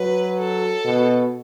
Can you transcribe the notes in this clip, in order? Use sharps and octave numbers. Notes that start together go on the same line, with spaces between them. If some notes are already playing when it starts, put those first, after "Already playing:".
Already playing: F#3 B4
A4
B2